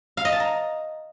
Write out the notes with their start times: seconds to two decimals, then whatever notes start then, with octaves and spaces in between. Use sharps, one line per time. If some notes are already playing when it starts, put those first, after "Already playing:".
0.17 F5
0.25 D#5
0.32 A5
0.40 A#5